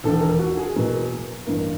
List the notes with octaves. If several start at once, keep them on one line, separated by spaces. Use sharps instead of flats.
E1 D#2 D3 A4
A#4
F#4
G#4
E2 B2 F#3 A#3
A1 G2 D3 A#4